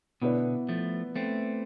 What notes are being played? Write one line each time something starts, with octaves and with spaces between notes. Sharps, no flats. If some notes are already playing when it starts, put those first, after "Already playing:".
B2 D3 B3 E4 B4 D5
F3 A3
A3 C4